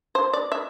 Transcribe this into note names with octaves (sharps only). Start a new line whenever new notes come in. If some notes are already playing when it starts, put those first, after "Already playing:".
C5
D5
E5